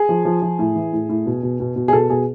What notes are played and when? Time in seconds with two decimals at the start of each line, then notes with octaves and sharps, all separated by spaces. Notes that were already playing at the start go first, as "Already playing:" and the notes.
Already playing: G#4
0.09 F3
0.25 F3
0.42 F3
0.59 A2
0.75 E3
0.92 A2
1.09 A2
1.26 B2
1.43 B2
1.60 B2
1.76 B2
1.88 G#4
1.93 B2 A4
2.10 B2 G#4